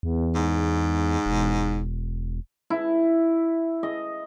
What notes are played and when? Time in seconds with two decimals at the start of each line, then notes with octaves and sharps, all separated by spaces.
0.03 E2
0.35 G#2
1.26 E1
2.70 E4
3.83 D#5